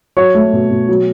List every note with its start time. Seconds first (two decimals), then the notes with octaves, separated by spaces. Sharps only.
0.17 F#3 C#5
0.34 A3
0.53 B2
0.71 B2
0.88 F#3